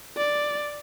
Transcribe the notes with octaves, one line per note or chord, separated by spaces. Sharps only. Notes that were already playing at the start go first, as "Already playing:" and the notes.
D5